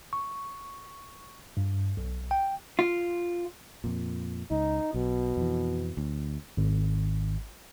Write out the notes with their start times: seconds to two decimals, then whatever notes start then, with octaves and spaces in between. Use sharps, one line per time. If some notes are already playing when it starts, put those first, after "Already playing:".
0.13 C#6
1.57 G2
1.97 B1
2.31 G5
2.79 F4
3.84 F2 A#2
4.51 C#2 D#4
4.94 B1 B2
5.37 F2 E3
5.97 D2
6.57 G#1